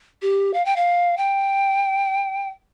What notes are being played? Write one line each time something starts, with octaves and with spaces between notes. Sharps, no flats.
G4
F5
G5
F5
G5